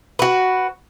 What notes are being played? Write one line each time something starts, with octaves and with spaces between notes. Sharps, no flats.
F#4 B4